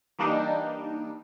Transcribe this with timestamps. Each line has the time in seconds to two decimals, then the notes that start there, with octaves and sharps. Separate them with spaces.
0.19 E3 G3 A#3 D4 D#4